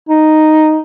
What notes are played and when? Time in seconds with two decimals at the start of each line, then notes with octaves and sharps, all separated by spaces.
0.09 D#4